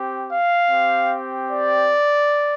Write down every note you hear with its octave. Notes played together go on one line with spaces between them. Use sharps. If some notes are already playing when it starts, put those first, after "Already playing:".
Already playing: C4 G4
F5
C4 G4
D5